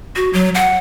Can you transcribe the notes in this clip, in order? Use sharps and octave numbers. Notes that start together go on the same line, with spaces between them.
F#4
F#3
F#5